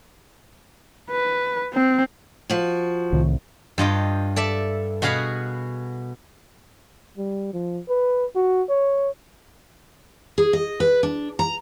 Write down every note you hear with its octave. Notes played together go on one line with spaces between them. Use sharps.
B4
C4
F3 F#4
C2 A2 D#3
G2 F4 D#5 G5
A4 D5 E5
B2 F#4 G#4 F5 F#5 B5
G3
F3
B4
F#4
C#5
G#4
D#5
B4
D4
A#5